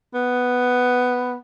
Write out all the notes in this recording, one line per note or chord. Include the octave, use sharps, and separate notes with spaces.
B3